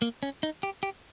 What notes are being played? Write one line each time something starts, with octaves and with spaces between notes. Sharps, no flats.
A#3
C#4
D#4
G4
G4